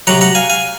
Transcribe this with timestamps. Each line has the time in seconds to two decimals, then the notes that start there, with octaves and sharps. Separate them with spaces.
0.07 C3 F#3 F#5 A#5
0.21 F#5 A#5
0.35 F5 G#5
0.50 F5 G#5